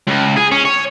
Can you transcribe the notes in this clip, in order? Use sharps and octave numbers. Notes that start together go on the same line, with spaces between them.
C#2
G#4
C#4
C#5